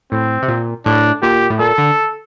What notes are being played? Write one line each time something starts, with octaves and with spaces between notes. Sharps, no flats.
A2 C4
C3
A#2
A2 D4
A#2 G4
A2
A#2 A4
D3